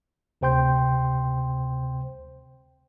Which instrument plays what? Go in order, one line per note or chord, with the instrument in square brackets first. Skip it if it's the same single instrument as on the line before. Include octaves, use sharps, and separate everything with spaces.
[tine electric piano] D2 C3 C5 G5 C6 G6